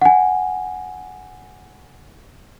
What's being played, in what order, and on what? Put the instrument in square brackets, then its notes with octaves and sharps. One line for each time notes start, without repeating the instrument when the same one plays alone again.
[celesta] F#5 G#5